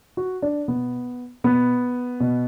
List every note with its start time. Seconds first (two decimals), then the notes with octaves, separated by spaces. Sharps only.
0.17 F#4
0.42 D4
0.68 B2 B3
1.44 B2 B3
2.20 B2